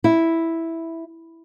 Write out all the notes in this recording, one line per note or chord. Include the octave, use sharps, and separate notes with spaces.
E4